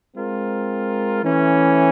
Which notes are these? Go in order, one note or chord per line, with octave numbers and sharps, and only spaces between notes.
G#3 C4 F4 A#4
E3 A3 C#4